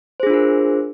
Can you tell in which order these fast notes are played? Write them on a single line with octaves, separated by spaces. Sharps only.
C5 G#4 D4 F4 A#4